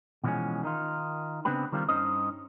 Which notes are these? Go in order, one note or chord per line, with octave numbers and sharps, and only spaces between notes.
B2 E3 F3 G3 G#3 C#4
D#3 D#4 F4
C#3 B3 C4 D4 G4 B4
D#3 G3 C4 F4 A#4
G2 C#4 D#4 C5 D#5